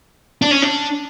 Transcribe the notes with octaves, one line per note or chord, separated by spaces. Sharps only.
D4
C#4
D4